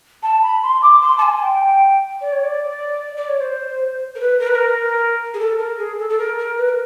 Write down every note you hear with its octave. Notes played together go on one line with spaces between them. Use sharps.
A5
B5
C6
D6
C6
A5
G#5
G5
D5
C#5
D5
D5
C#5
C5
A#4
B4
A#4
B4
A#4
G#4
A4
A#4
G#4
A4
A4
A#4
A#4
B4
A#4